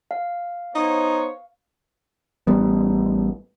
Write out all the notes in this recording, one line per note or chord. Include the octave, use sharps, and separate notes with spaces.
F5
B3 D#4 C5 C#5
A1 G3 B3